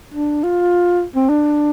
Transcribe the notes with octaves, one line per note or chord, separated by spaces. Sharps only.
D4
F4
C4
D4